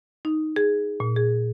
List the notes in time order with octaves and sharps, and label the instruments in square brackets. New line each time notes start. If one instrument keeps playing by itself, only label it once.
[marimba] D#4
G#4
A#2
G#4